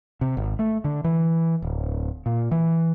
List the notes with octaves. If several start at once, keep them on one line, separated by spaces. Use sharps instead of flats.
C3
G#1
A3
D3
E3
D1
A#2
E3